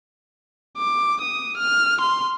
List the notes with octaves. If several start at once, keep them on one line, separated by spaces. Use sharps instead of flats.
D6
D#6
F6
C6